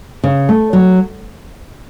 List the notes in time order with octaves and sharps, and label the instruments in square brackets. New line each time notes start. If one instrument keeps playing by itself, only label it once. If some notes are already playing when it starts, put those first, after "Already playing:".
[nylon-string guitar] C#3
A3
F#3